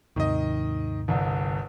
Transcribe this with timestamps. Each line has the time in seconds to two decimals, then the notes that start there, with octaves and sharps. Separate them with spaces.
0.16 D#2 G#2 C3 D#3 D#5
1.08 G1 C2